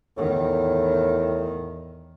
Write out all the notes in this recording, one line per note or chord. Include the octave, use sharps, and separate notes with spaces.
E2 A2 D#3